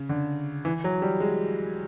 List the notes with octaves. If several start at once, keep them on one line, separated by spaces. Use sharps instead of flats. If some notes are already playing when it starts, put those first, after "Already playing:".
Already playing: C#3
D3
E3
F#3
G3
G#3